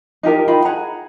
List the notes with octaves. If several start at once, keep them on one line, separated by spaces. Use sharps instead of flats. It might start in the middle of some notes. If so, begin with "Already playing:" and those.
D#4 F4 G4 A#4
D#4 F4 G5 B5
G#4 F#5 A#5